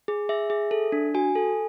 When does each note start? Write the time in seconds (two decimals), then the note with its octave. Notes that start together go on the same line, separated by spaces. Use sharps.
0.08 G#4
0.29 G#4 E5
0.50 G#4
0.71 A4
0.92 D4
1.14 F#4 G#5
1.35 A4